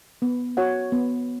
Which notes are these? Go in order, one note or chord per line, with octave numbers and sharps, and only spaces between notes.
B3
F#4 C#5 F#5
B3